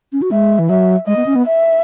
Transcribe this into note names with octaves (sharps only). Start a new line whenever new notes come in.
C#4
F#4
G#3 E5
E3
F#3 E5
G#3 D#5
B3
C#4
B3
E5